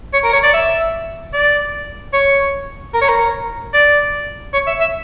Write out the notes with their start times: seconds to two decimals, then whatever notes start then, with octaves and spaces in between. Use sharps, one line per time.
0.13 C#5
0.24 A#4
0.33 C#5
0.43 D5
0.54 E5
1.33 D5
2.13 C#5
2.94 A#4
3.01 C#5
3.09 A#4
3.74 D5
4.53 C#5
4.67 E5
4.80 E5